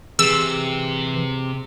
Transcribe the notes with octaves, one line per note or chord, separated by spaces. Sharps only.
C3 E3 G#4 E6